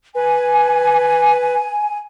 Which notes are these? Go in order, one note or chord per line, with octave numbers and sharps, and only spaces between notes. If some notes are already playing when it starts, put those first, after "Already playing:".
B4 G#5